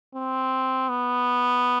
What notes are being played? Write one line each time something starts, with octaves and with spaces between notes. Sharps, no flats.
C4
B3